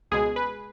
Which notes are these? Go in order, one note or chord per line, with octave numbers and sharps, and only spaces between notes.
C#2 B2 G#3 G#4
B4